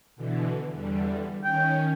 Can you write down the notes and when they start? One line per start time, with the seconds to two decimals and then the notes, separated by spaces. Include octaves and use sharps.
0.16 B2 D3 E3
0.71 E2 D3 G3
1.44 D#3 C#4 G5